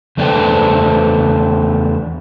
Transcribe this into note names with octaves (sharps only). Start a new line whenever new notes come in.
E2 A3 D4 B4 C5 G5